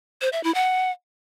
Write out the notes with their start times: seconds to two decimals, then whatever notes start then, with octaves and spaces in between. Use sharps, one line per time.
0.22 C5
0.33 E5
0.44 E4
0.55 F#5